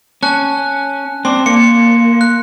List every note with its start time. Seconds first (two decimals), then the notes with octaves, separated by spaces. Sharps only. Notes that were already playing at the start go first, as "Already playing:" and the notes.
0.23 C#4 A5 F#6
1.25 C4 D4 C6
1.46 A#3 C#7
2.21 F#6